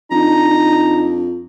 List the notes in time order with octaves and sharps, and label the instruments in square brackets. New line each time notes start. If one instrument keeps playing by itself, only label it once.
[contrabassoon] F2 [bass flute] D4 [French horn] D#4 [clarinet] A#5